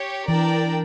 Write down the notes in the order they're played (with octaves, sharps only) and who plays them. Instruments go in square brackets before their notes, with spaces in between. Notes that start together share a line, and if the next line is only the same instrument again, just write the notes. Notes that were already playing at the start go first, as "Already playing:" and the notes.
Already playing: [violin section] G4 C#5
[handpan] E3 [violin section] D4 A#4 D5 G5